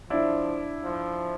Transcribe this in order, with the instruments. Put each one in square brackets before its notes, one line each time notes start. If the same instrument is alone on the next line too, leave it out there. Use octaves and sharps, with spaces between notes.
[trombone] F3 [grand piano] D4 E4
[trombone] F3